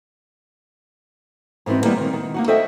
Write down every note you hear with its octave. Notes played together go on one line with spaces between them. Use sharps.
G#2 E3 B3 C4 F#4
E3 G3 G#3 A#3 B3
D#3 C4
D#3
A#3 D#4 F#4
F#4 A4 C5 D#5 E5 G5